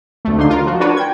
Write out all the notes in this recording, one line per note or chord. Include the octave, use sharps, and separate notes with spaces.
D2 A3
D3 D4 D#4 F5 C6
F4 A#4
F3 F#4
D4 F4 F#4 A#4 B4 C#5
G5 G#6